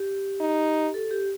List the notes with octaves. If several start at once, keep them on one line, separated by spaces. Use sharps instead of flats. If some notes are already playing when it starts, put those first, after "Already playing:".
Already playing: G4
D#4
A4
G4